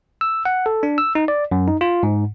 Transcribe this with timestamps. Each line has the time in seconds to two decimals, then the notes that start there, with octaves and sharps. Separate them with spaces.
0.21 E6
0.45 F#5
0.66 A4
0.83 D4
0.98 E6
1.15 D#4
1.28 D5
1.51 F#2
1.68 D#4
1.81 F4
2.03 G#2